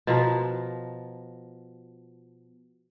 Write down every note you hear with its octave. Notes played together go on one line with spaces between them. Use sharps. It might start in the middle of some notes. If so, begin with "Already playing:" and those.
B2 F3 A#4